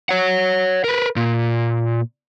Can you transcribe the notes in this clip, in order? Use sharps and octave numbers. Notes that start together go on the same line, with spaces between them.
C#5 F#5
A#4 B4
A#2